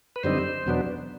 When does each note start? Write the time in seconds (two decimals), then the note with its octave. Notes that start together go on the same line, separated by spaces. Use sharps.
0.16 B4
0.23 F#2 D3 G3 C4 D#4 C5
0.66 E2 B2 F#3 B3 D4